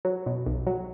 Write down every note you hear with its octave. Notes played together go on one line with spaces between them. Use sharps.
F#3
B2
B1
F#3